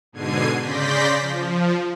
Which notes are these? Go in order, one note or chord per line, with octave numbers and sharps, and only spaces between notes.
G#2 B2 D3 G#6 C7 D#7
C#3 D5 C6 G6 A#6 B6
F3